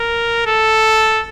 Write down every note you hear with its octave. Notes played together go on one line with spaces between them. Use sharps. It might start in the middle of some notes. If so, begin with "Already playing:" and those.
Already playing: A#4
A4